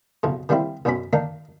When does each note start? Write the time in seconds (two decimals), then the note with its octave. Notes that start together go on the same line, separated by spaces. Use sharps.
0.23 B1 F2 C#3
0.49 D#3 G3 A#3 C4 E4
0.85 B1 F#2 B2 C#4 B5
1.13 D#3 A#3 D4 D#4